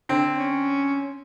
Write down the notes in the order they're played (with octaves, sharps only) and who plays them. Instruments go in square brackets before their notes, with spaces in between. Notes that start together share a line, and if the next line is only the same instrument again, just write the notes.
[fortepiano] D3 C4
[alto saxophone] C#4